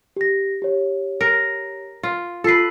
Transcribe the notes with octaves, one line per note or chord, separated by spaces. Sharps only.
G4 A#6
G4 C#5
A#4
F4
F4 A4 B4 C7